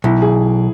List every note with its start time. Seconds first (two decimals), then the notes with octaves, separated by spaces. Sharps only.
0.04 B1 E4
0.22 G#4